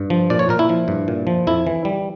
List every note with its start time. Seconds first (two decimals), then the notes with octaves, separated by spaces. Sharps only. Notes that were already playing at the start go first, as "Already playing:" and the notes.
Already playing: G2
0.10 F3
0.30 A#2 D5
0.39 C#5
0.49 A#2 A#4
0.59 E4
0.69 F3
0.88 G2
1.08 A#2
1.27 F3
1.47 F2 E4
1.67 E3
1.85 G3